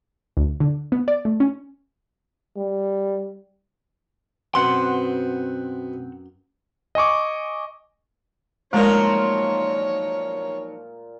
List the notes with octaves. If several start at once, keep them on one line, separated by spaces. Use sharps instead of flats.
D2
D3
B3
D5
A3
C#4
G3
F#2 B2 B3 C4 F#5 C6
D#5 G#5 C#6 D6
A#2 F3 F#3 G#3 D#4 A#4 C#5 A#5